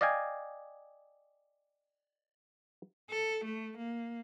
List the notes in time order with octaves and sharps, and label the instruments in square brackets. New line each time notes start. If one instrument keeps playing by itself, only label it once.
[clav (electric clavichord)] D5 D#5 F5 G5 G#5
[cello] A4
A3
A#3